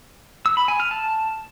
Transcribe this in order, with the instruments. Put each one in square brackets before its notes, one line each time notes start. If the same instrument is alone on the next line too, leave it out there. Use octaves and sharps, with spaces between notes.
[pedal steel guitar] E6
B5
G#5
F6
A5